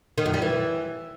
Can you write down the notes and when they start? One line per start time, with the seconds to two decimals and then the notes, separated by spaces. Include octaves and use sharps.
0.18 D#3
0.26 F#2
0.34 G3
0.42 E3